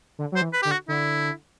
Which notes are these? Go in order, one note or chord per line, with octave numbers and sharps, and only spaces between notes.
D3
F#3 C5
E3
B4
D3 G4
F#4
D3 E4